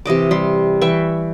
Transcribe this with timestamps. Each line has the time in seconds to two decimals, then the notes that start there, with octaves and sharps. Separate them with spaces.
0.06 C3 E3 D#5 D6
0.31 G3 C6
0.81 E3 E5 G5 C#6